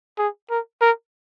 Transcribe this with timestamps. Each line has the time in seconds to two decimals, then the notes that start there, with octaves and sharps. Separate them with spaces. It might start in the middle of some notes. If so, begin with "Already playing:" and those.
0.18 G#4
0.50 A#4
0.81 A#4